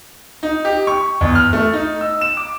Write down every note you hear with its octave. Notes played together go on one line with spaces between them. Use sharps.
D#4
G4
C#6
E2
F6
A3
D#4
E6
E7
D6